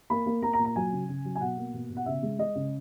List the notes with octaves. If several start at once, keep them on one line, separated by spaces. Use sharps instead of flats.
A#3 B5
A#3
A#3 A#5
A#5
A#2
A#5
F#3 G#5
C#3
C#3
F#3
G#5
B2 F#5
A#3
B2
B2
F#5
C#3 E5
G#3
G#3 D#5
C#3